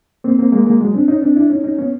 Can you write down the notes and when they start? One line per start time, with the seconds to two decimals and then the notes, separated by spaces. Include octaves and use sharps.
0.24 A#3 C4
0.38 A#3 C4
0.52 G#3 A#3
0.66 G#3 A#3
0.81 F#3 G#3
0.94 C4 D4
1.08 C#4 D#4
1.22 C4 D4
1.36 D4 E4
1.50 C#4 D#4
1.64 C#4 D#4
1.78 B3 C#4